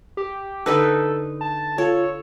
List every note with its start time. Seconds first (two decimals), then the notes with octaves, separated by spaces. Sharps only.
0.17 G4
0.66 D3 D#4 A4 B4
1.41 A5
1.78 F4 A4 C#5